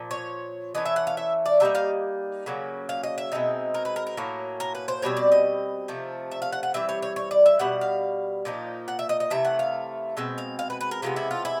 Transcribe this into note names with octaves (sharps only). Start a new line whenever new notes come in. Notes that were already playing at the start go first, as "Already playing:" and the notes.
Already playing: A#2 F3
C#5
E3 A3 C#4 D#5
E5
F#5
F5
E5
D5
D3 G3 A#3 D#4 E5
F5
C#3 F#3 A#3 C#4
F5
D#5
E5
B2 G#3 C4 D#4
A#4
B4
A#4
A#4
A2 F#3 A#3 C#4
A#4
B4
C5
B2 G3 C4 C#5
D5
D#5
C3 F3 A3
E5
F5
F#5
F#5
E3 G3 C4 E5
C#5
C#5
C#5
D5
E5
B2 G3 F#5
F5
A#2 F3 A#3 D#4
F#5
E5
D#5
D#5
C3 E3 A3 E5
F#5
F5
B2 G#3 C4 E5
F5
F5
B4
B4
A#4
C3 E3 G#3 B3 F4
E4
F4
E4